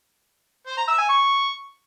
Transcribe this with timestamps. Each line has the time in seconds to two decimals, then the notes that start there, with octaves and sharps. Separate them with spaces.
0.67 C5
0.77 A#5
0.88 E5
0.98 G#5
1.09 C#6